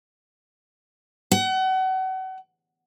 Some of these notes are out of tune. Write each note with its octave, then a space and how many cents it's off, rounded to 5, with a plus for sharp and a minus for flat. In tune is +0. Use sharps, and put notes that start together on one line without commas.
F#5 +35